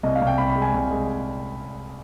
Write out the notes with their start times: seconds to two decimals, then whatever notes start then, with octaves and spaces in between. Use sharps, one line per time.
0.03 C2 D#5
0.15 F5
0.21 C2
0.27 G5
0.38 C2 B5
0.50 B5
0.56 G#3
0.62 G#5
0.74 C2
0.91 G#3